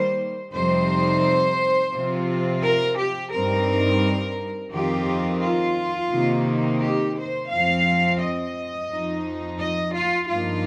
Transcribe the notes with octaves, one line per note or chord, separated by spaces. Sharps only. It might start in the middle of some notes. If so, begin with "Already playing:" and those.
Already playing: D#3 G3 A#3 C5
F2 C3 G3 C4 D#4 C5
C3 F3 C4 F4
A#4
G4
G2 G3 C4 D#4 A#4
F2 D#3 C4 F4 G4
F4
C3 D#3 A#3 D#4
G4
C5
F2 F3 C4 F5
D#5
F2 F3 D#4
D#5
F4
G2 F3 A#3 D#4 F4